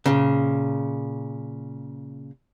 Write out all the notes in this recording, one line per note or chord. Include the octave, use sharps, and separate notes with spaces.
A#2 C#3